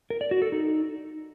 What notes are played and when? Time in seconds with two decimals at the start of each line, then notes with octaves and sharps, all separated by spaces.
0.10 A#4
0.21 D5
0.31 F#4
0.42 A4
0.52 D#4